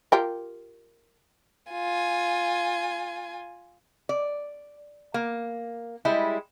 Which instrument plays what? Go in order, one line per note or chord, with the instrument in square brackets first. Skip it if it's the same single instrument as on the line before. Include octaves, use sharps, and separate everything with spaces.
[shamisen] F4 G4 A#4
[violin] F4 G#5
[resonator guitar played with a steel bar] D5
A#3
G3 G#3 E4